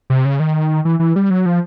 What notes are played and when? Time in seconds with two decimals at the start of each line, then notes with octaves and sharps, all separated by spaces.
0.10 C3
0.25 C#3
0.40 D#3
0.85 E3
1.00 E3
1.16 G3
1.30 F#3
1.46 F3